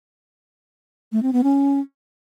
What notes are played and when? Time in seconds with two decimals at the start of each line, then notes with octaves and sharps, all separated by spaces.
1.12 A3
1.23 C4
1.33 B3
1.43 C#4